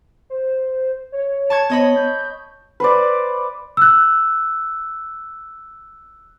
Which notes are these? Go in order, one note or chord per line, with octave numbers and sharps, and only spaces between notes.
C5
C#5
A5 C#6 G#6
B3 C#5 D#5 B5
G6
B4 C5 D5
E6 F#6